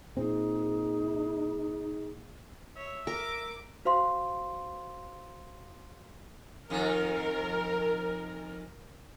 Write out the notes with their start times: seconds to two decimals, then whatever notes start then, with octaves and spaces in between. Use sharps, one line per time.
0.17 A#2 C4 D#4 G#4
2.76 C#5 E5
3.07 A#4 D6
3.85 F#4 C5 F5 C6
6.70 F2 D#3 A#4